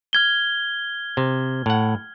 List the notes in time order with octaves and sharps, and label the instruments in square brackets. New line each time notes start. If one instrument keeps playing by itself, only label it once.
[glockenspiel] F6 G#6 G7
[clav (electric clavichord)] C3
A2 F#5